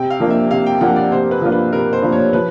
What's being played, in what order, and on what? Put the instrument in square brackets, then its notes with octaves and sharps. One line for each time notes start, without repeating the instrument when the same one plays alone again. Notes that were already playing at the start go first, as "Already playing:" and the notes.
Already playing: [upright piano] C3 [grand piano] G5
[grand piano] F5
[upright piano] F3 A#3 D4 F4
[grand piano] E5
[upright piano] C3 [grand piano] F5
[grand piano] G5
[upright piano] F3 A#3 D4 F4 [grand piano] F#5
[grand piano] D5
[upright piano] C3 [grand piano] C5
[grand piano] B4
[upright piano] F3 A#3 D4 F4
[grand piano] B4
[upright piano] C3 [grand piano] A#4
[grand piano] C5
[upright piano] F3 A#3 D4 F4
[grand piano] C#5
[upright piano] F3 [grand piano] B4